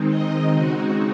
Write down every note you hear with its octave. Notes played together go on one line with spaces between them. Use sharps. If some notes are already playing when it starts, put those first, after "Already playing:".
Already playing: D#3 G#3 C4 D#4
D#5
C#3 G#3 C4 D#4 F#4